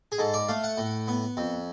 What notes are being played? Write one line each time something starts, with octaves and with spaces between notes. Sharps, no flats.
G#4
G#2 A4
D5
A3 F5
F#5
A2
B3
F2